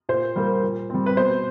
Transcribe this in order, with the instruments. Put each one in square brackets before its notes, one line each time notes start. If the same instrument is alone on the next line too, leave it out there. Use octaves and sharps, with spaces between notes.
[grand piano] A#2 C5
G3 A#3
A#2
G3 C4
B4
B2 C5